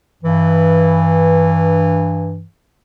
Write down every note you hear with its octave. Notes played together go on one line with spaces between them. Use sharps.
G2 E3